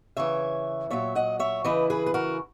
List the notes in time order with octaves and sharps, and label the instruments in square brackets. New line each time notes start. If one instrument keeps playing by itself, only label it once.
[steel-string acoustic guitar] C#3 E3 C#5 E5
A#2 F#3 C#5 E5
D#5 F#5
C#5 E5
C#3 E3 B4 D#5
G#4 B4
B4
F#4 A#4